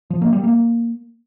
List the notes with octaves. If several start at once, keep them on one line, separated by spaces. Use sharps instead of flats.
F3
A#3
G3
A#3